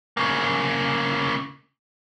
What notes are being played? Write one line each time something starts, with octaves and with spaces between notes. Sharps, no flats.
C#3 A#3